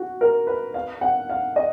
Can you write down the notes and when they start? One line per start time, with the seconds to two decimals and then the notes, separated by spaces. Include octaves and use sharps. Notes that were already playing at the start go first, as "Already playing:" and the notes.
Already playing: F#4
0.21 A#4
0.47 B4
0.74 F5
1.01 F#5
1.29 F5
1.56 D#5